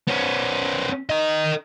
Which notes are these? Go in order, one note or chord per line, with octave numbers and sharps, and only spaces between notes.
B3 C#4
A#4 D#5